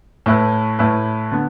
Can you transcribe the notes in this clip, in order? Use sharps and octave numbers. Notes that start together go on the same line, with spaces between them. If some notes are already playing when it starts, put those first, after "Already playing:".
A2 A3 E4 B4
A2 A3 E4 B4
D3 B3